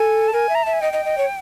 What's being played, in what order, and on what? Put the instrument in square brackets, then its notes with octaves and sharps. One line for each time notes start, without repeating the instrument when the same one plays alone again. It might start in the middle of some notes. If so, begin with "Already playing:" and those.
Already playing: [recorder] A4 [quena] G#5
[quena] A5
[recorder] A#4 [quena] G#5
[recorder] E5
[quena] A#5
[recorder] E5 [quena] A5
[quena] G#5
[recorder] D#5 [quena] G5
[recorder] D#5
D#5
C#5